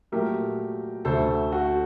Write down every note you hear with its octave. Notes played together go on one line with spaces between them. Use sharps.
A#2 F#3 A3 G4 A#4
D2 D3 A3 A4 C5
F#4 A4